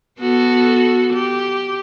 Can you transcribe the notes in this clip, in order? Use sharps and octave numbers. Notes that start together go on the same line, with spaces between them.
B3 F#4 A4
G4